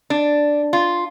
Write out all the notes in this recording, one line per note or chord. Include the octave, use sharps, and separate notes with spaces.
D4
F4